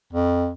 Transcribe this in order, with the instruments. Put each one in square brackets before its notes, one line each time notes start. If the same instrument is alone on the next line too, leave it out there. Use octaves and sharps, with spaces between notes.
[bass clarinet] F2